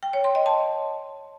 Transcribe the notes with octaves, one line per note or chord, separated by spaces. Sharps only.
G5
C#5
C6
D#5
A5